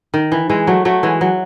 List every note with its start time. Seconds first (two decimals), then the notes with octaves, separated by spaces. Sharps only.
0.14 D#3
0.32 E3
0.50 E3 G#3
0.67 F#3 A3
0.85 F#3 A3
1.03 E3 G#3
1.21 F#3